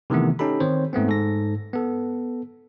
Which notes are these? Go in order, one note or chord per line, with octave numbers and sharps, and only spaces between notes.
C3 D#3 E3 A3 B3
C#4 D#4 G4 A4 B5
D#3 C4 C5 C#5
G#2 A3 B3 C4
G#2 A4 A#6
B3 A4